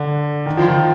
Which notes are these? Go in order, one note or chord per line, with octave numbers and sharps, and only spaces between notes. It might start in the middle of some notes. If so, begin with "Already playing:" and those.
Already playing: D3
D#3
F3
D#3